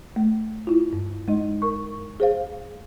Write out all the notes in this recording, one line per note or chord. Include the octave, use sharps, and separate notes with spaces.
A3
E4 F4
G2
G#3 D#4 D#5
A#4 C#6
G#4 C5 F5